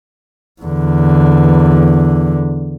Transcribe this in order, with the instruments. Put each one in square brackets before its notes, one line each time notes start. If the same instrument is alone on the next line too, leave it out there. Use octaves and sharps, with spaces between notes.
[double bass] E2 D3